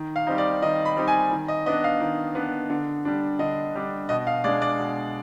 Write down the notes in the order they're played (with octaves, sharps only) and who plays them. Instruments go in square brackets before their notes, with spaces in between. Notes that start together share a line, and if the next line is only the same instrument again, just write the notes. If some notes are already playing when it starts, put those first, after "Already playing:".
Already playing: [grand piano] D#3
F5
G3 C4 D#4
D5
D#3 D#5
B5
G3 C4 D#4
G#5
D#3
D#5
B3 D4 D#5
F5
D#3
B3 D4
D3
G3 D4
D3 D#5
G3 D4
B2 D#5
F5
G#3 D4 D5
D5
B2